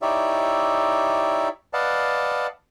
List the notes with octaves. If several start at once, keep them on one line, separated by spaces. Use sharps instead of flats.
D#4 E4 G4 C#5 D5 E5
B4 D5 D#5 F5 F#5 A5